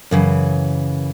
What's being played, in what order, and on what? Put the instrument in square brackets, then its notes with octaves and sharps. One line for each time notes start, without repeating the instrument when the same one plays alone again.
[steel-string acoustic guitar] F#2 C#3 E3